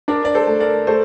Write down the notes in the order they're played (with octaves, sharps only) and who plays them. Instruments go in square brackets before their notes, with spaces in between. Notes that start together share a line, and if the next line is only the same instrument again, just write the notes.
[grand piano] D4 [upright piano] A#4 D5
[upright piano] D5
A4 C5
[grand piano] A3
[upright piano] A#4 D5
[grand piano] A3 [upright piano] A4 C5